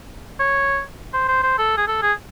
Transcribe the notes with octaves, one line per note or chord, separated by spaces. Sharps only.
C#5
C5
C5
C5
A4
G#4
A4
G#4